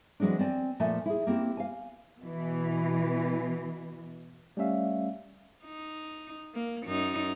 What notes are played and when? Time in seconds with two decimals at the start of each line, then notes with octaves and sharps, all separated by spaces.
0.20 E3 F#3 G#3 C4 D4
0.39 C4 D5 G#5
0.80 A#2 F3 A3 D5 E5 G#5
1.06 E4 G#4
1.27 A#3 C4 E4 G4
1.57 F5 G#5
2.21 B2 E3
4.57 G3 A3 C#4 E5 F5
5.64 D#4
6.54 A#3
6.86 F#2 D#4